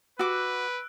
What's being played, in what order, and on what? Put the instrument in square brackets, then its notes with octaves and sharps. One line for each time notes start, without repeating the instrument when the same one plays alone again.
[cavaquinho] F#4 D6 [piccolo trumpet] B4 [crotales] E6 F#6 D7